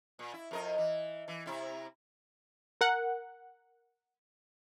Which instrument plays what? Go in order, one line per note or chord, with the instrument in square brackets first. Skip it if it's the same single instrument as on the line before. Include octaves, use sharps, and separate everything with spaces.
[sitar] A#2
E4
F2 A#4 D#5
E3
E3
C3 E4
[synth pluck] A#4 F#5